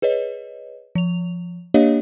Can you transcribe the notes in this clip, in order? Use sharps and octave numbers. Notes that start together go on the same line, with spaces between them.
G#4 B4 C#5 D#5
F3 F7
A#3 D4 G4 C#5 D#5 F5